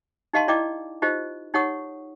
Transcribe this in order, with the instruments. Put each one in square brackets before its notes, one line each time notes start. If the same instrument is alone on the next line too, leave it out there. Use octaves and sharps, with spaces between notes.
[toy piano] D#4 G4 D#5 F5 A5 C6
E4 D5 D#5 G5 D6
D#4 F4 G4 C5 D#5
D#4 G4 C#5 F#5 C#6 D#6